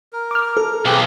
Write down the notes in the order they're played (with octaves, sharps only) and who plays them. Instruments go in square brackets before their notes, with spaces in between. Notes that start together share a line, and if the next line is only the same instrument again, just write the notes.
[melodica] A#4
[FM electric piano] D6 F6
A4
[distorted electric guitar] B1 [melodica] C4 G4 G#4